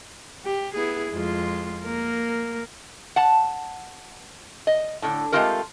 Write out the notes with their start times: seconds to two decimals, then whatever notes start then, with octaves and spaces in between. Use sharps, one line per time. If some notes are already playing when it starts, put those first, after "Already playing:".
0.45 G4
0.74 B3 E4 G#4
1.11 F2 G#3 F4
1.84 A#3 A#4
3.16 F#5 A5
4.67 D#5
5.02 A2 D3
5.32 G#3 A3 C4 F4 G4 A#4